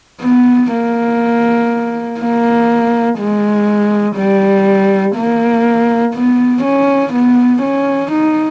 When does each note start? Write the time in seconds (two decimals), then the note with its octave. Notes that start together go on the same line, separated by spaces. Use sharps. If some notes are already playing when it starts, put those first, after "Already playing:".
0.22 B3
0.72 A#3
2.20 A#3
3.19 G#3
4.17 G3
5.16 A#3
6.15 B3
6.63 C#4
7.13 B3
7.63 C#4
8.12 D#4